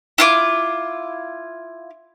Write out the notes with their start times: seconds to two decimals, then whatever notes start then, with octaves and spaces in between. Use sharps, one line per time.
0.18 E4 F4 D6